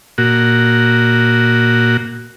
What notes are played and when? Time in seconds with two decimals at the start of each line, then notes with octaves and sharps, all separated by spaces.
0.18 A#2 F#4